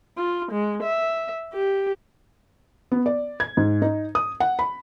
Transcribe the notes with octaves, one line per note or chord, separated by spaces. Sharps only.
F4
G#3
E5
G4
B3
D5
G#6
G#2
D#4
D#6
F#5
B5